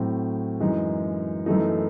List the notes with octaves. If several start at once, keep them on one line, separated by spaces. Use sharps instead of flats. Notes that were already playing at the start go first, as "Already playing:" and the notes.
Already playing: A2 F#3 C4
F#2 E3 G#3 D#4
F#2 E3 A3 D#4